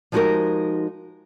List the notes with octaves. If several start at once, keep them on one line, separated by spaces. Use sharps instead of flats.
F3 G#3 D#4 F#4 G4 A#4